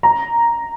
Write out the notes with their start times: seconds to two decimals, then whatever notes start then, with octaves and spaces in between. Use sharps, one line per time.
0.03 A#5